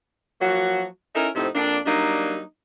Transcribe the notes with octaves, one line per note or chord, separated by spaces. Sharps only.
F3 F#3 A#3 F#4
C#4 D#4 E4 A4 A#4
A2 C3 F3 C4 D#4
F2 A#3 D4
F#3 G3 A#3 D4 D#4